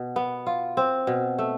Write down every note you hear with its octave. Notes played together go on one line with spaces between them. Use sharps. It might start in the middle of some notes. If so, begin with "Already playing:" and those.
Already playing: B2
B3
F4
C4
B2
A3